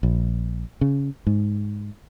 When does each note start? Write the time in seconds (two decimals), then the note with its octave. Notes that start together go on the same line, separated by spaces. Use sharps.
0.03 A#1
0.81 C#3
1.27 G#2